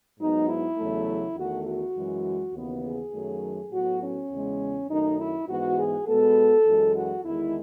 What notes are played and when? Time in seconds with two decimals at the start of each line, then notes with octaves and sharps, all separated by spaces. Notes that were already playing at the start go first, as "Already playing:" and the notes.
0.19 G#2 F#3 B3 D#4
0.48 E4
0.78 E2 C#3 F#3 A3
1.36 E2 D#3 A3 F#4
1.66 F#4
1.96 F#2 E3 G#3
2.54 D#2 C#3 E3 B3
2.84 G#4
3.13 F#2 D#3 F#3 A3
3.72 A2 F#3 B3 F#4
4.01 C#4
4.31 E2 C#3 G#3
4.89 F#2 D#3 A3 D#4
5.19 E4
5.48 G#2 E3 B3 F#4
5.78 G#4
6.07 B2 G#3 B3 A4
6.66 F#2 E3 G#3
6.95 F#4
7.24 E2 D#3 G#3 E4